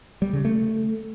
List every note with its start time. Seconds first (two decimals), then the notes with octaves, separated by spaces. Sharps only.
0.22 G3
0.33 C#3
0.45 A3